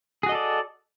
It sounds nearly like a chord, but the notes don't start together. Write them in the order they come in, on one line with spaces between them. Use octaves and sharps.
G#4 F#4 D#5 A4 D5